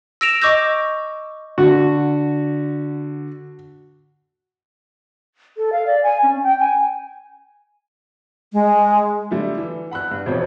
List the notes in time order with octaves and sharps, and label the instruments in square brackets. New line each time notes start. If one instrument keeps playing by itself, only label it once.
[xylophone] E6 A#6 D7 E7 F7
D#5 C#6 D6 E6 G6 A#6
[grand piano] D3 [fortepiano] F#4
[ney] A4
F5
D5
G#5
C#4
G5
G#5
[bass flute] G#3
[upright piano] D3 G3 A3 E4
E3
F#5 B5 E6 F#6
G2
E1 F2 C4 C5 C#5 G6